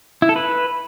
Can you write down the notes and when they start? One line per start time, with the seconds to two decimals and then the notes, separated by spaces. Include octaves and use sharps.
0.22 E4
0.29 A4
0.36 B4